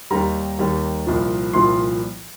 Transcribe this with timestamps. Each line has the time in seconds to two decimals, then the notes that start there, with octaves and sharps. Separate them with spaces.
0.11 D#2 D#3 G3 A#5
0.59 D#2 D#3 G3
1.07 C2 A#2 F3
1.54 C2 A#2 F3 C6